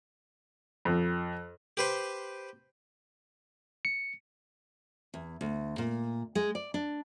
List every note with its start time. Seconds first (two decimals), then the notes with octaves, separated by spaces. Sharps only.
0.85 F2
1.77 G4 B4 C5
3.85 C#7
5.14 E2
5.41 D2
5.78 A#2
6.35 G#3
6.55 D5
6.74 D4